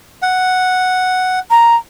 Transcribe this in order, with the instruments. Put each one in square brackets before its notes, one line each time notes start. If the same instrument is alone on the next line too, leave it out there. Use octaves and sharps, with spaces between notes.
[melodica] F#5
[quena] A#5